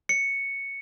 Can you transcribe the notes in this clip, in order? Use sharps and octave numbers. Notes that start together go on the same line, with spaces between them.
C#7